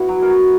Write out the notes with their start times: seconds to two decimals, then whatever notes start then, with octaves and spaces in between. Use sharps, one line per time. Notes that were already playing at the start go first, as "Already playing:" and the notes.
Already playing: B3 E4 F#4
0.09 F#3
0.22 A#4
0.30 F#3